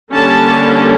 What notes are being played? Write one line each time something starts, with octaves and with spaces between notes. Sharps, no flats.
D3 G3 A#3 C#4 A5